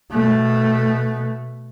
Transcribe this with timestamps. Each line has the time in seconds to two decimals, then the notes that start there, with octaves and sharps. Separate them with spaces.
0.12 B2 A3